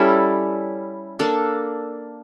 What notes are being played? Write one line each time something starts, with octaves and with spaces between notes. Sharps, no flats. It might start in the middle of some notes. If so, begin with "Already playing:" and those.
Already playing: G3 C#4 E4 A4
A#3 D4 A4